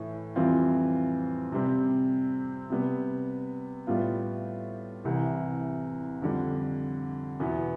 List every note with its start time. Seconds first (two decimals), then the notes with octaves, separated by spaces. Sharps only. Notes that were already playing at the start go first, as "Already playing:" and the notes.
Already playing: A2 E3 A3 E4
0.36 F2 E3 G3 C4 F4
1.52 C3 G3 C4
2.70 C3 G3 B3
3.87 A2 G3 B3 F4
5.04 C2 C3 E3
6.22 F2 D3 G3 D4
7.40 E2 B2 B3 E4